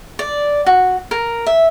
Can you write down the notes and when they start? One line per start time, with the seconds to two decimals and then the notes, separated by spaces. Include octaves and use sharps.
0.19 D5
0.66 F#4
1.11 A#4
1.46 E5